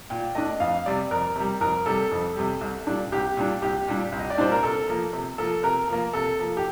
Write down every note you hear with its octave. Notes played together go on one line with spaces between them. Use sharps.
A#2 G5
A3 D4 D#5
F2 F5
C3 G3 D5
F2 A#4
C3 G3
F2 A#4
C3 G3 A4
F2
C3 G3
C2
A#2 G3 D4
C2 G4
A#2 G3 D4
C2 G4
A#2 G3 D4
C2
D#5
D5
A#2 G3 D4 C5
A#4
C3 A4
F3 A#3
C3
F3 A#3 A4
C3 A#4
F3 A#3
C3 A4
F3 A#3
G4